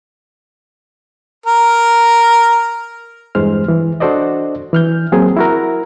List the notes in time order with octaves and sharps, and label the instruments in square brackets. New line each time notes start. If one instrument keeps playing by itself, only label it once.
[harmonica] A#4
[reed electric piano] E2 G2 E3 G#3 C5 F6
E3
D4 F#4 A4 C5 D5 D#5
E3 F6 G6
F#3 A#3 C4 G#4
E4 F#4 A#4